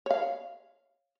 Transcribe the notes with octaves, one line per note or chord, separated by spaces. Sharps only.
C#5 F5